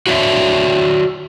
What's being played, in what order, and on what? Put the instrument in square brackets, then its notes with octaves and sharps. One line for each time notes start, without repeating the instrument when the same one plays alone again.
[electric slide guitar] F#4 C#5 D5 E5